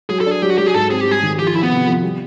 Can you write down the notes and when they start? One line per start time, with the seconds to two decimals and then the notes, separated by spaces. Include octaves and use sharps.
0.10 F#3 G#4
0.21 A4
0.26 D4
0.31 G#4
0.42 F#3 G4
0.50 F#4
0.58 F#3 G4
0.67 G#4
0.74 G#2 A4
0.91 C4 G#4
1.01 G4
1.07 G3 G#4
1.23 D#3
1.39 F3 G4
1.47 F4
1.55 F3 E4
1.63 B3
1.71 C3
1.87 F3
2.03 G3